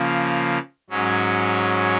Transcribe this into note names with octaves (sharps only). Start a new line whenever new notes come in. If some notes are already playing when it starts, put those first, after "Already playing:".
Already playing: C#3 F3 A#3
G#2 F#3 C#4